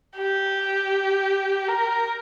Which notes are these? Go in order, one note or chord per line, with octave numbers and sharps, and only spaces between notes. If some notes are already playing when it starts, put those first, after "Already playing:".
G4
A#4